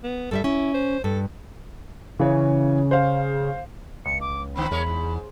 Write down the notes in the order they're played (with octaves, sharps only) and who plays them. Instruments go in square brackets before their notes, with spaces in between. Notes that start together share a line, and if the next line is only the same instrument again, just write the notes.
[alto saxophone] B3
[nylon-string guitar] G2 G3 E5 [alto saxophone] A4
[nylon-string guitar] C#4 [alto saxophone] E4
[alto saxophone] C5
[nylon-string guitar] G2 [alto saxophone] A4
[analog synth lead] C#3 [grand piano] E3 C#5
[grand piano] C5 F5
[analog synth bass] C#2 [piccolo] C#7
[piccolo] D6
[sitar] D3 B3 C4 [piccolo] B5
[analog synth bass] E2 [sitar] G#3 A#4 C#5
[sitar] G#2